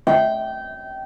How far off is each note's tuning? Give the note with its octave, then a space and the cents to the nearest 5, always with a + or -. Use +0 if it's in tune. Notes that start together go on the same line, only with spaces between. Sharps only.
G5 -20